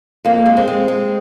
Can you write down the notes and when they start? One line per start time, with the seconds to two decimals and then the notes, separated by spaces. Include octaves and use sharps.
0.25 F2 A#3
0.46 G#3
0.57 C4
0.68 G#3
0.88 G#3